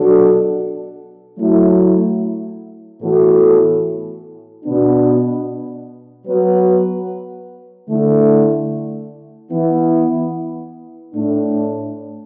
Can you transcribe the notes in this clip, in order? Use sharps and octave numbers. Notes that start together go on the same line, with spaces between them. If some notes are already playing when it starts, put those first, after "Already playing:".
Already playing: B2 F#3 D4 F#4 A4
F#3 A3 E4
A2 E3 B3 F#4 A4
B2 B3 D4
F#3 B3 F#4 B4
D3 A3 E4
E3 B3 E4
A2 A3 D4